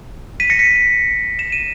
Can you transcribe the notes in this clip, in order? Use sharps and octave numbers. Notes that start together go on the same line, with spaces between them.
B6 D#7
A#6 C#7
B6 D#7
E7
D#7